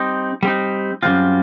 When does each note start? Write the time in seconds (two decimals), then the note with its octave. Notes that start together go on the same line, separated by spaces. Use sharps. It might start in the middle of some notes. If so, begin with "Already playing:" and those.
Already playing: G3 C4 D#4
0.43 G3 C4 D#4
1.03 F#2 D#3 G3 C4 F4